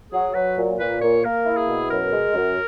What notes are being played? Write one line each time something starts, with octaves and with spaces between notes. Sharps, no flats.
F#3 G#4
F#3 B4
A#2
A#2 B4
A#2 C#5
A#3 A#4
E4
G#4
B2
F#2 A#4
G#3
F#2